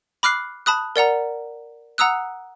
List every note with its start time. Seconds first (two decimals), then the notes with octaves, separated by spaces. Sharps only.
0.23 B5 D6 F6 F#6 C7
0.66 A5 B5 D#6 F#6
0.96 A#4 D5 F#5 A#5
1.98 F#5 A#5 D#6 E6 F#6